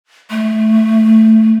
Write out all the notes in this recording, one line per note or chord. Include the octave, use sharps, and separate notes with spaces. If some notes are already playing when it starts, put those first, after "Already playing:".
A3